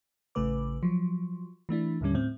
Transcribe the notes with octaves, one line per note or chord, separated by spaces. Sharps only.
A1 C#3 A3 B4 D6
F3 F#3
E3 A3 D4 E4
D#2 A2 D3 G3 C#4
A2 C4